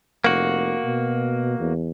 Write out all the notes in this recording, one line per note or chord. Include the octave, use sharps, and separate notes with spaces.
F1 A#3 F#4
B2
E2